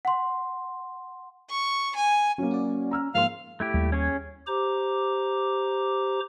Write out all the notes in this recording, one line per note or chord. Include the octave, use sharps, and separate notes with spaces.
F#5 C6
C#6
G#5
F#3 A#3 C#4
F#4 D5
A#5 E6 F6
G#2 F3 A#3 F5 C6
A3 E4 G4
D#2 G3 A#3
C#4 G#4 C#5
G4 C5 A#5 D6